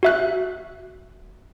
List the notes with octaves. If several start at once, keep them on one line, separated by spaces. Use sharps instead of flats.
F#4 E5 F#6